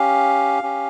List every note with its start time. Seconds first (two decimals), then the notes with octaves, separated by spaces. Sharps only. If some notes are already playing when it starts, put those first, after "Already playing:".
Already playing: C#4 G4 F5
0.63 C#4 G4